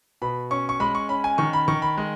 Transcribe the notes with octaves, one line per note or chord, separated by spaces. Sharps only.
B2 B5
C#4 C#6
C#6
G#3 B5
C#6
C#4 B5
G#5
D#3 C#6
B5
D#3 C#6
B5
G#3